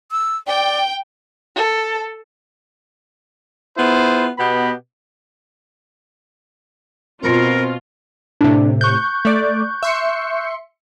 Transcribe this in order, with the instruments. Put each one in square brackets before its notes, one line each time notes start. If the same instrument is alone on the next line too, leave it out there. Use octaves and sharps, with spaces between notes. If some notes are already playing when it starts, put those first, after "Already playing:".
[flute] E6
[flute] D5 [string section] G5
[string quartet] A4
[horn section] B3 E4 F4 G#4 C5
B2 B3 G4 D#5 B5
[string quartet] B2 [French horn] C4 [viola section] F4 [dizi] A#4
[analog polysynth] A2 C3 [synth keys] D4
[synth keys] C#6 F#6 G6
[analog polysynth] A3 D5
E5 C6 C#7